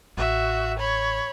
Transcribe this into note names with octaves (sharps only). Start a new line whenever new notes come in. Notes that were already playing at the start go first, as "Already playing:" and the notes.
A1 F#4 E5
C#5 B5